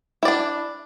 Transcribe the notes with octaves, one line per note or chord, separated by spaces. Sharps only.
D4 E4 D5